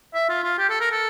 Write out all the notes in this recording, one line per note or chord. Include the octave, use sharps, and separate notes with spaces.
E5
F4
F4
G4
A4
A#4
A4